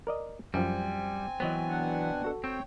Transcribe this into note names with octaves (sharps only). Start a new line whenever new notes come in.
A#4 D5 D#5
F#2 F3 G3 C4 G#5
E3 F#3 B3 C5 C#5 D#5
B2 D4 F#5
F#4 A4
C4 C#5 G5